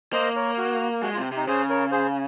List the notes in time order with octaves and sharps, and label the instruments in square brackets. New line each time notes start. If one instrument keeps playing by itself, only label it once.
[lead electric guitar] A#3 [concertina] C5 D#5
[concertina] A#4 C#5
F#4
[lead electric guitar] G#3 [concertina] F#4
[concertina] F4
[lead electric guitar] C3
[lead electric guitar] C3 [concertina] D#4
[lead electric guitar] C#3 [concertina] G#4 C5
[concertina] A#4 C#5
G#4 C5